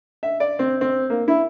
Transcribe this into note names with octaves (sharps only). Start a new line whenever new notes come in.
E5
D5
C4
C4
A#3
E4